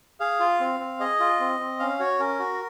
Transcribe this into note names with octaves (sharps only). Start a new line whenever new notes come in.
G#4 F5
F4
C4
C4
G#4 D#5
F4
C4
C4
C#4 F5
F#4 C#5
C#4 A#4
F#4